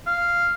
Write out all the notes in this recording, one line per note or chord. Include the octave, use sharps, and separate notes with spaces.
F5